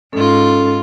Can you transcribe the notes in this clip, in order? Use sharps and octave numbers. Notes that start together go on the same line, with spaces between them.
G#2 C#4 F4 A4